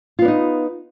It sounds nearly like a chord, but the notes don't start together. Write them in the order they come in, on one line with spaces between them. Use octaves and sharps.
F4 B3 D4 D#4